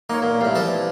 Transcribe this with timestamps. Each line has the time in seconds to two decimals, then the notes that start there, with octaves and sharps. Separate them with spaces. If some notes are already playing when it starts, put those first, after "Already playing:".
0.10 A#3 D#4 C#5
0.22 A#2
0.41 C2 A2 G3 F5
0.55 E3 F3 D5